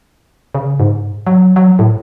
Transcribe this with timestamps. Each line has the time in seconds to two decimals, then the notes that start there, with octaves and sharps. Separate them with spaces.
0.55 C#3
0.80 G#2
1.27 F#3
1.56 F#3
1.79 A2